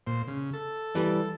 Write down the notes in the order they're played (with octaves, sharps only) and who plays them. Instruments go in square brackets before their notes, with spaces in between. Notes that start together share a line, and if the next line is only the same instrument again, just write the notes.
[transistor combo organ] A#2 C5
C#3
A4
[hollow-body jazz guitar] E3 G3